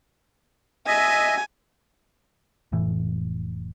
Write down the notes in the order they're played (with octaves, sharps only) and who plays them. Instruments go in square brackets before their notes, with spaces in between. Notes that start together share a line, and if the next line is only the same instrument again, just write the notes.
[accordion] D#5 E5 [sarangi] G#5
[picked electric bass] F1 A2 E3